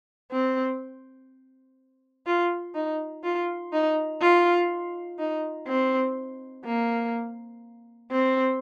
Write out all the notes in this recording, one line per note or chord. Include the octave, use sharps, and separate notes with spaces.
C4
F4
D#4
F4
D#4
F4
D#4
C4
A#3
C4